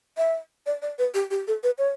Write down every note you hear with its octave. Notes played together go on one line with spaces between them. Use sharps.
E5
D5
D5
B4
G4
G4
A4
B4
C#5